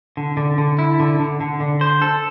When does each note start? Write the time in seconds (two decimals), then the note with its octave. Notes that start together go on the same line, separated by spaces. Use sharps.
0.17 D3
0.37 D3
0.58 D3
0.79 E4
1.00 D3
1.20 D3
1.41 D3
1.60 D3
1.81 C5
2.02 A4